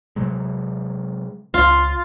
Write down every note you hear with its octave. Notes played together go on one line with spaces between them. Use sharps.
C3 F#3 G#3
C#2 F4